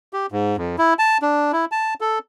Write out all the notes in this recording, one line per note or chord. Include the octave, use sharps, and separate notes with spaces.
G4
G#2
F2
E4
A5
D4
E4
A5
A4